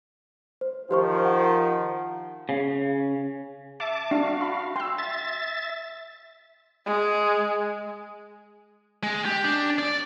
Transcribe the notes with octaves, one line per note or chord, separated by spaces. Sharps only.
C5
D#3 F3 G4 C5 C#6
F#5
C#3
E5 A5 D6
D4 F#4 F5
B5
G5 C6 E6
E5 A6
G#3
G#3
G4
D4
D5